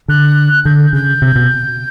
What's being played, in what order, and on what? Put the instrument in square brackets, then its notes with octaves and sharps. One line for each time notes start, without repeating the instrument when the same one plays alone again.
[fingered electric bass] D3 [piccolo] F#6
[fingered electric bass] D3 [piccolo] G6
[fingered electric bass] C#3 [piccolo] G6
[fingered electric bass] C3
B2